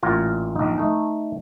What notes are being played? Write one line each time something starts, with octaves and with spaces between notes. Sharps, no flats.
A1 A#2 F4 A#5
A#1 D#4
A3 D#4